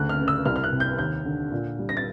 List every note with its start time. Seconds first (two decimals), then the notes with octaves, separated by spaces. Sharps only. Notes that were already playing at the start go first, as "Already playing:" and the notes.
Already playing: D2 C#3 F#6
0.09 F6
0.19 C#3
0.28 E6
0.45 C2 F6
0.56 F6
0.64 F#6
0.72 C3
0.80 G6
0.98 D#2 G6
1.25 D3
1.52 A#2
1.79 G3
1.89 A#6
1.97 A6